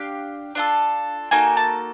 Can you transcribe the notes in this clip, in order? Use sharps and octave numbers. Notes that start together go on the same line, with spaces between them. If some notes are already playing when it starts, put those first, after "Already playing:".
Already playing: D4 G4 F5
D4 F4 A4
A#3 D#4 F#4 A4 G#5
A5